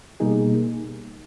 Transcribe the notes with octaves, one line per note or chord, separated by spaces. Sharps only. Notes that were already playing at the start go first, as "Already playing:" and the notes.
B2 G3 A#3 D#4 G#4